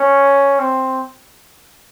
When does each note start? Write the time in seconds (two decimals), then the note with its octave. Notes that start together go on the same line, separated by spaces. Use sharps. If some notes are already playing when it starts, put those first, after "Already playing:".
Already playing: C#4
0.59 C4